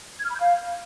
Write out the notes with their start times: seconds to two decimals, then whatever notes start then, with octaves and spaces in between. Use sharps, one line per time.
0.19 G#6
0.24 F6
0.30 B5
0.35 G6
0.40 F5